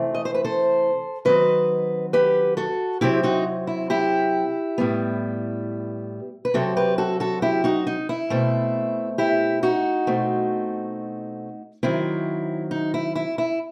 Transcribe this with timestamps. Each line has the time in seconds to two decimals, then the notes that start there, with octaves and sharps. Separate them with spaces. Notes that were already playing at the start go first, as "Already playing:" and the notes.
Already playing: C3 E3 A3 C4
0.15 D#5
0.25 C5
0.34 B4
0.44 A4 C5
1.25 D#3 F#3 C4 B4 D#5
2.13 G4 B4
2.57 F#4 A4
3.01 C3 F#3 C4 E4 G4
3.23 D#4 F#4
3.67 E4
3.90 E4 G4
4.78 A2 G3 B3
6.45 B4
6.54 C3 F#3 C4 F#4 A4
6.77 G4 B4
6.98 F#4 A4
7.20 F#4 A4
7.42 E4 G4
7.64 D#4 F#4
7.87 D#4
8.09 E4
8.30 B2 A3 C4
9.18 E4 G4
9.63 D#4 F#4
10.07 B2 A3 C4
11.83 D#3 F#3 C4 E4
12.71 D#4
12.94 E4
13.15 E4
13.38 E4